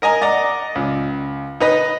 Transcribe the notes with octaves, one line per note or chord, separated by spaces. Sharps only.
A#4 D#5 G#5 A#5
D5 D#5 F#5 A#5
C#2
D#4 B4 D#5